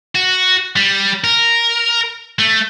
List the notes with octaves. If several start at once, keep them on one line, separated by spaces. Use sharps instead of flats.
F#4
G3
A#4
A3